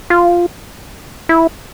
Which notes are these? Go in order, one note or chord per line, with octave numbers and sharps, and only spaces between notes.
F4
E4